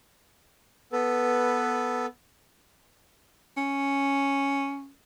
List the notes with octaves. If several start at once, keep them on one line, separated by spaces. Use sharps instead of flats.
B3 A4 B4
C#4